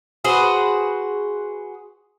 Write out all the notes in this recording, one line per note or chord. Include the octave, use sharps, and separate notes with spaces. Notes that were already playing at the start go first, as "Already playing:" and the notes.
F#4 G#4 B4 C5